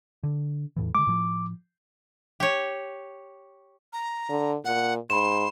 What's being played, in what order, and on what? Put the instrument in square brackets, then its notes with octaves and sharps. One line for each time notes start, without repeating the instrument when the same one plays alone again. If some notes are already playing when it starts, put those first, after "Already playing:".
[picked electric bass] D3
E2 A2 E3
[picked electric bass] D3 G#3 [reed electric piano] D6
[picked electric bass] A2 F3
[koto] G4 C#5
[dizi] A#5
[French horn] D3
[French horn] A#2 [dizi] F#5
[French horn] G#2 [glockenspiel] B5 E7 [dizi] C6